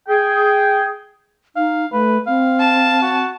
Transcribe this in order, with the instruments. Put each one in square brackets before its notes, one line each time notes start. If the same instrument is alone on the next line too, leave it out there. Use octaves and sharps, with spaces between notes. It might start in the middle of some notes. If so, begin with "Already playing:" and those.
[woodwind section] G#4 G5
[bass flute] D#4 [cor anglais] F5
[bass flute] A3 [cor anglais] B4
[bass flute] C4 [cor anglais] F5
[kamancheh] A5
[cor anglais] F#4